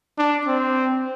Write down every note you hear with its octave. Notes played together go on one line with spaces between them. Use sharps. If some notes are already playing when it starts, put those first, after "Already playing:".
D4
C4